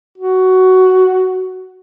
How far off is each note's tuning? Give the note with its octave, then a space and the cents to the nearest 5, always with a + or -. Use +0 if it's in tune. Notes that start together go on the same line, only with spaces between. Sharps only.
F#4 +10